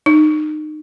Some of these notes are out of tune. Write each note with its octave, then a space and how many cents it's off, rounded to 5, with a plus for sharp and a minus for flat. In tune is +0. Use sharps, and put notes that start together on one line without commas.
D#4 -25